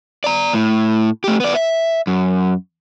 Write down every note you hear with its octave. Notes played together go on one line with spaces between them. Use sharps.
D5 A#5
A2
A3 G4
B3 D5
E5
F#2